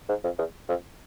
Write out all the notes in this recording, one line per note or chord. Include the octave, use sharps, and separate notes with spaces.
G#2
F2
E2
F2